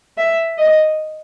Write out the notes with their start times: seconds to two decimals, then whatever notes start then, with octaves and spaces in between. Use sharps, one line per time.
0.17 E5
0.58 D#5